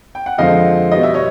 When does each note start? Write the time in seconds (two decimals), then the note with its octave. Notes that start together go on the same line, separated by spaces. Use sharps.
0.15 G5
0.26 F#5
0.38 F2 D3 F3 G#3 C4 D#5 F5
0.92 B2 G3 B3 D#5
1.03 E5
1.14 C#5 D#5